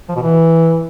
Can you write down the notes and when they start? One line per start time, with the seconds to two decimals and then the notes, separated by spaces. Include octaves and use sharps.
0.09 F3
0.16 B2
0.23 E3